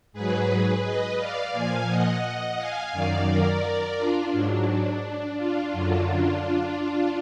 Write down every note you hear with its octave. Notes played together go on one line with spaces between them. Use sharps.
G#2 F#3 G#4 B4
B4 D#5
D5 F5
A#2 F3 F5 G#5
D#5 F#5
F5 G#5
F#2 D#3 F#3 D5 F5
A#4 D5
D4 F4
G#2 F#3 D4
D4 F4
F#2 D3 F#3
D4 F4